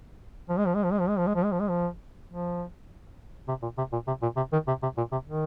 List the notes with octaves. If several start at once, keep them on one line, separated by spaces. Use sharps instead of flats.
F3
G#3
F3
G#3
F3
G#3
F3
G#3
F3
G#3
F3
G#3
F3
G#3
F3
F3
C3
A#2
C3
A#2
C3
A#2
C3
D#3
C3
C3
A#2
C3
D#3